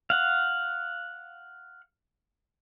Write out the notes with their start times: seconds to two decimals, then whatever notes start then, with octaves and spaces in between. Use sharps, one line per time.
0.10 F5 F#5